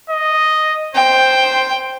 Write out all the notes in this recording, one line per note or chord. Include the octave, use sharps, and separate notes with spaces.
D#5
C5 G5